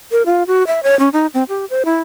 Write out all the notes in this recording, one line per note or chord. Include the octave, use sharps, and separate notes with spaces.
A#4
F4
F#4
E5
C#5
C#4
D#4
C4
G4
C5
E4